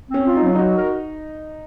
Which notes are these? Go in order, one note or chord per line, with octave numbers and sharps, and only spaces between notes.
C4
C#4
F4
D#4
F#3 C#4
D#4 F#4
A#4